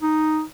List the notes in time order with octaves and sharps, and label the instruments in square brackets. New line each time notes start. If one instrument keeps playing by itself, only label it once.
[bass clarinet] D#4